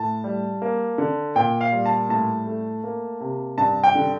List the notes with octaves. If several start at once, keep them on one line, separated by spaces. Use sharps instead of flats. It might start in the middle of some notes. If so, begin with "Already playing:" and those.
Already playing: A2 A5
G3
A#3
D3
A#2 G5
F5
G3
A5
A2 A5
A3
A#3
C3
G2 A5
G5
D3